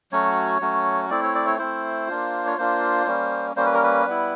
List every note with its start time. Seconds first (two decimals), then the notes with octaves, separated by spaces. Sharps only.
0.12 F#3 A3 C#4 F#4 C#5
0.61 F#3 A3 C#4 F#4
1.10 A3 C4 E4 D5
1.23 C#5
1.35 D5
1.47 C#5
1.59 A3 C4 E4 C5
2.08 A#3 D4 F4
2.47 C#5
2.58 A#3 D4 F4 C5
3.07 G3 A#3 C#4
3.56 G3 A#3 C#4 C5
3.65 B4
3.74 A#4
3.83 B4
4.06 G3 B3 E4